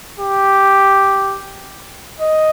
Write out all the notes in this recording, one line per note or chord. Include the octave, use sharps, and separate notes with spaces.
G4
D#5